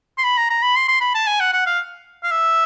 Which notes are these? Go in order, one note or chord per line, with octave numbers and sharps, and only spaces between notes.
C6
B5
A#5
A#5
B5
C6
C6
B5
A5
G#5
F#5
F#5
F5
F5
E5